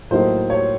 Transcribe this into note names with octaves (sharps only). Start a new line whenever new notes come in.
A2 F#3 A#3 D#4 C5
C#5